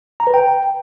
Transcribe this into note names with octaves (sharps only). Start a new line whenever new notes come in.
A#5
B4
G5